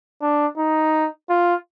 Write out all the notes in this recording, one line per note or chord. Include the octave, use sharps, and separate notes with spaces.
D4
D#4
F4